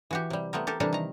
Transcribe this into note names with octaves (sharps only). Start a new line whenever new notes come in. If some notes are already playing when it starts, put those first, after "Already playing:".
E3 F#4 G4
C3 G3
A3 B3 C4 A#4
G4 A4 A#4
C3 E3 G3 D4 A4 A#4
D#3 A#5